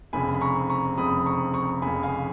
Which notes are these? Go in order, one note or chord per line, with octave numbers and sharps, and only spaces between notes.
F1 F2 C#3 G#5 B5
B5
A#5 C#6
A#5 C#6
F1 F2 C#3 B5 D#6
A#5 C#6
A#5 C#6
F1 F2 C#3 G#5 B5
F5 G#5